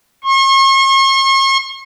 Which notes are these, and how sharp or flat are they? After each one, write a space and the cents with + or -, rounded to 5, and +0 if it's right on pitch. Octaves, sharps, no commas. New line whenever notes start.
C#6 -45